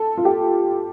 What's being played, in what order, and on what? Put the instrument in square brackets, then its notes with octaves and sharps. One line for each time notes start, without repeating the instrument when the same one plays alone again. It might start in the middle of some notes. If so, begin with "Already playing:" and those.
Already playing: [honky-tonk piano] A4
F4
G4